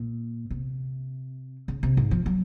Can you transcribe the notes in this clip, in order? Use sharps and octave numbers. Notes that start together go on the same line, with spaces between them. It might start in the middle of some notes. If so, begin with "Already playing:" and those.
Already playing: A#2
C3
C#3
C3
G#2
F3
F#3